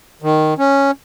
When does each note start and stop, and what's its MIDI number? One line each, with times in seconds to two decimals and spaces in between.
0.22 0.54 51
0.58 0.91 61